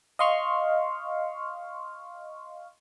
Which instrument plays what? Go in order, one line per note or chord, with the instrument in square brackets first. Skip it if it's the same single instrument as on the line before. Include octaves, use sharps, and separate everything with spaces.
[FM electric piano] D#5 F5 C6 C#6 F6